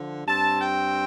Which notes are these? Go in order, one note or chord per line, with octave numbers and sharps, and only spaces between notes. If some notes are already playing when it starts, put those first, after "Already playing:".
Already playing: D3 F3
G2 G3 C4 A5
G5